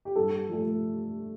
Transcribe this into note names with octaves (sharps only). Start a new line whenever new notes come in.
G4
G2 A4
F3 A3